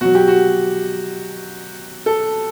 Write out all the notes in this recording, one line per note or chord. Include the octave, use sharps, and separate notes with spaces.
B2 F#3 F#4
G4
F#4
A4